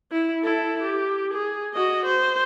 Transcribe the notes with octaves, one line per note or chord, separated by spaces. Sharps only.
E4
E4 A4
G4
G#4
F#4 D#5
C5